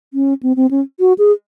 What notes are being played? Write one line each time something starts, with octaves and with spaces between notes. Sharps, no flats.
C#4
C4
C4
C#4
F#4
G#4